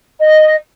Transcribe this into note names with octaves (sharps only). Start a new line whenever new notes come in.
D#5